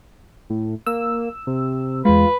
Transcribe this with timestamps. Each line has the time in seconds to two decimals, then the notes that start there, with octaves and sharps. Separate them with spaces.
0.50 A2
0.86 A#3 E6
1.47 C3
2.05 E2 G#3 F4 B4